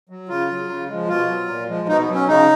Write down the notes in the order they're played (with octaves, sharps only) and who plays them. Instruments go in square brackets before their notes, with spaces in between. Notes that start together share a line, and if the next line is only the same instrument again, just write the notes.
[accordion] F#3
C#3 F4
F#3
C#3
F3 G#3
B2 F4
F#3
A#2
F3 G#3
B2 D#4
B3
F#3
C#4
C#3 D#4